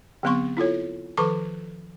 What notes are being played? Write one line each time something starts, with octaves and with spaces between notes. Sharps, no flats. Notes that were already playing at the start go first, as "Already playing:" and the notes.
D3 F#3 B3 C4 C6 C#6
E4 F4 A4 C#5
D#3 F3 A4 B4 C#6 D6